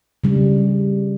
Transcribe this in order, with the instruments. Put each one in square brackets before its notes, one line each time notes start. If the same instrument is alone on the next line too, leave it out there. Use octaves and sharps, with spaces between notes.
[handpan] C#3 G3